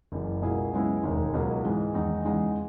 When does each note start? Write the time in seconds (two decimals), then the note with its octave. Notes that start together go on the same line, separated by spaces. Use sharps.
0.12 F#1 F#2 E3
0.42 C#2 B2 A#3 E4 G#4
0.73 F#2 C#3 G#3 B3 E4
1.03 E1 D#2 D#3 G#3
1.34 C#2 B2 F#3 A#3
1.64 G#2 E3 G#3
1.94 E2 D#3 G#3 D#4
2.24 E2 C#3 G#3 D#4